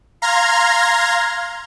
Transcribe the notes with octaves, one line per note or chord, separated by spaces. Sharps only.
F5 A#5 C6 F6 G#6 A#6